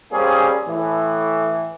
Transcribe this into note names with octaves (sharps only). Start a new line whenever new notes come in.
G3 A#3 C4 C#4 G#4
A2 E3